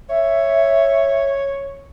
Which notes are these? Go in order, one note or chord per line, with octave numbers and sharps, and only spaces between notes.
C#5 E5